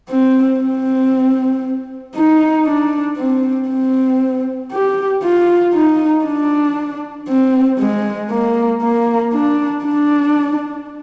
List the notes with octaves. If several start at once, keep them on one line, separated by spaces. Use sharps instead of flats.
C4
C4
D#4
D4
C4
C4
G4
F4
D#4
D4
C4
G#3
A#3
A#3
D4
D4